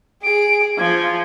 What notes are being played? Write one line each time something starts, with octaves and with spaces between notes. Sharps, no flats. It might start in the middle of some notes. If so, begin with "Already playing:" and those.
G#4 D7
F3 G#6